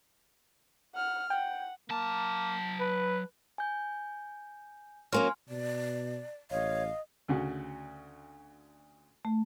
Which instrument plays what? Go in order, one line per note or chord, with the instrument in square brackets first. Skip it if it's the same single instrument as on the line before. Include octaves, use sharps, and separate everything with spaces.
[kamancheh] F#5 F6
[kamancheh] F#5 [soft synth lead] G5
[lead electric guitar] F#3 A5 [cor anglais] A#3
[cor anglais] B4
[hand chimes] G#5 G6
[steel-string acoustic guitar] F#3 A#3 C#4 [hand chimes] G#5 C6 F6
[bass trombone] B2 [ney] D5
[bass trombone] A1 [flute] C#5 [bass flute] D#5 [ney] F5
[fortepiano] D2 C#3 F#4
[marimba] A3